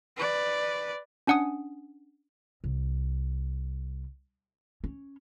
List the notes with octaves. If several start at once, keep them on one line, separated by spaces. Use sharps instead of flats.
B4 D5
C#4 D4 F#5 G#5 D#6
C2
C#4